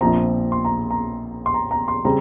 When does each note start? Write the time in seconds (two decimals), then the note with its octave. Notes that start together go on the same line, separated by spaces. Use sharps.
0.01 A#1 A#2 F3 C4 A#5
0.52 C6
0.65 A#5
0.91 A#5
1.46 C6
1.54 A#5
1.71 A#5
1.88 C6
2.05 C#3 G3 C4 A#5